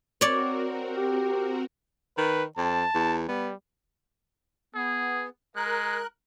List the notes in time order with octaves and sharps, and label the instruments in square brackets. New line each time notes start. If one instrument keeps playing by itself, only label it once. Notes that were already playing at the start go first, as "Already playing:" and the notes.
[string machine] C4 F#4 A#4 [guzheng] C#5 D5
[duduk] G4
[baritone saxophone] D#3 [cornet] B4
[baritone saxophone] F2 [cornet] A5
[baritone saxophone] E2
[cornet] G3 [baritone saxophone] B3
[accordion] B3 [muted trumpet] G#4
[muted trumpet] G#3 [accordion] A#4 F#6